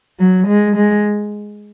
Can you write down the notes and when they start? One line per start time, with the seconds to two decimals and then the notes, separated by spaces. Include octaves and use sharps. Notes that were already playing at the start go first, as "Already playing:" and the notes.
0.20 F#3
0.48 G#3
0.76 G#3